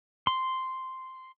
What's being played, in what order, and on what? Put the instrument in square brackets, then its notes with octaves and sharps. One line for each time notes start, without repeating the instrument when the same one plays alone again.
[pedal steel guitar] C6